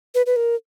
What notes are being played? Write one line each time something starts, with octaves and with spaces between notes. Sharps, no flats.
B4
B4
A#4